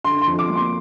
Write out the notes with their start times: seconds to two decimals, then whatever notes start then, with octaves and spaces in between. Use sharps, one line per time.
0.04 D3 C6
0.21 C6
0.27 F2
0.39 D6
0.50 A#3
0.56 C6